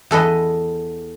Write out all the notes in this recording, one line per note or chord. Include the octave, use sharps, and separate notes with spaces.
E2 A4 B4 D#5